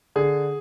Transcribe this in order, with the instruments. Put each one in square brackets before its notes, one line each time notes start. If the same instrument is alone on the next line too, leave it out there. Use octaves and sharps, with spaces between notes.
[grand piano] D3 G#4